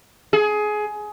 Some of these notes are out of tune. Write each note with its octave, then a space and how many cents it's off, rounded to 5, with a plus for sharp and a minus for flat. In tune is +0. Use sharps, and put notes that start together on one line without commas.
G#4 +20